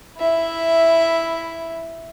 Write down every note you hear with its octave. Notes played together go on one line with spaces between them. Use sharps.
E4 E5